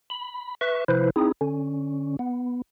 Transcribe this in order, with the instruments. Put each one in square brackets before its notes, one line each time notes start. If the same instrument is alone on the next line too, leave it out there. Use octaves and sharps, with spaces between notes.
[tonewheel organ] B5
B4 E5 C#6
C3 F3 E4 B4 C5
C4 D#4 E4 G#4
D3 C#4
B3